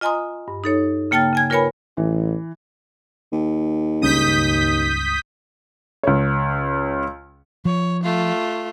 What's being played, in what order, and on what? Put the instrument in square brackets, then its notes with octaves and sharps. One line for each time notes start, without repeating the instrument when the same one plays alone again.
[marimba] F4 D#5 G#5 A#5 C6 D#6
G2
D#4 A4 C#5
C#3 A#3 G5 A5 F6 A6
C#3 G#5 G#6
F4 A#4 B4 C#5 G#5 B5
[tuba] A1 [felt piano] E3
[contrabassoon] D#2
[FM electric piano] C#2 G2 C#3 [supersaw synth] D#6 G6 B6
[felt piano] C#2 C#5
[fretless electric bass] F3 [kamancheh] C#5
[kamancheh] A3 F4